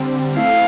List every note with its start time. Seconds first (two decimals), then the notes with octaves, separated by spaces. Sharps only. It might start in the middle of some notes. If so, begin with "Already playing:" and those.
Already playing: D3 G3 C4
0.36 A3 C4 E4 A4 F5